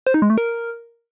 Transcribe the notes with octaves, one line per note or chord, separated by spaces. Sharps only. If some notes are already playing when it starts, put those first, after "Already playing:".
C5
D#4
G#3
A3
A#4